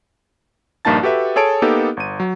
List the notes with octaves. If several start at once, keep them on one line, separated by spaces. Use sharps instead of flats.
A#1 G2 A#3 D#4 A5 A6
F#4 G4 A4 B4 E5
G#4 A4 C#5 A5 D7
A#3 B3 D#4 G4 A4
G1 D#7
F#3